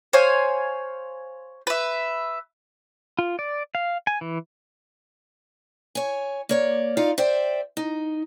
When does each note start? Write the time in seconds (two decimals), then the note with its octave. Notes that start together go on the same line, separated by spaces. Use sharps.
0.13 C5 C#5 F5 G#5
1.67 B4 E5
3.19 F4
3.39 D5
3.75 F5
4.07 G#5
4.21 E3
5.95 C#5 G#5
6.49 A#3 C#5 D5
6.97 D#4 F4 D5 F5
7.18 C5 D5 E5 G5
7.77 D#4